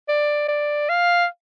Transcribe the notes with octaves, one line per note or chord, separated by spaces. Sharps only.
D5
D5
F5